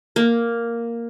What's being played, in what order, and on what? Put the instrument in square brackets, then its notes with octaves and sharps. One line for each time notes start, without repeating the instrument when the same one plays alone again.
[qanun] A#3